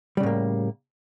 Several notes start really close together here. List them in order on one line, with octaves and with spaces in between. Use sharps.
G3 C#3 A2 A#3